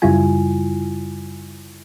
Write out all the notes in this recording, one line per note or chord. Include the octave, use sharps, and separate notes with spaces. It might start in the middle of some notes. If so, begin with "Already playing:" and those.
F#2 C#3 G3 E4 F4 G#5